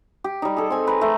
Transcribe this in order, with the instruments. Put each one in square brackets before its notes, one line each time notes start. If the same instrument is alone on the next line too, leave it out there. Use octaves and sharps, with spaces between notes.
[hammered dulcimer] G4
G3 D#4
G#4 A4
C4 G#5
B4 A#5
A3 A#5